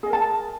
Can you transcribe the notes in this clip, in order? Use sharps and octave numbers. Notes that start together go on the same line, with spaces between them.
G#4 A#4 D#5 A5